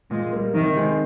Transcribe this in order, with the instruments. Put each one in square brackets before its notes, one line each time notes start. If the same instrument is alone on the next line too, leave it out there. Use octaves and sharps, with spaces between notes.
[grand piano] A#2 [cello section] G#3
[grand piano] G3 A#3
[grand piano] C3 [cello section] D#3
[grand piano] D#3 G#3 C4